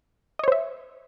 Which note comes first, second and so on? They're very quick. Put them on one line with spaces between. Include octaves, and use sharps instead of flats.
D#5 C#5 C5 E5